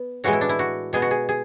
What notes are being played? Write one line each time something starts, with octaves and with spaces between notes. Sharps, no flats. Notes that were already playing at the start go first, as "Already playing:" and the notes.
Already playing: B3
A2 E3 G#3 F#4
E4
D4
E4
F#4
B2 G#3 B3 G#4
F#4
G#4
G#4